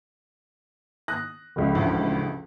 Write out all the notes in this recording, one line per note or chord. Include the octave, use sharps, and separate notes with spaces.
D#6 F#6 A#6
F1 C#2 E5
A1 D2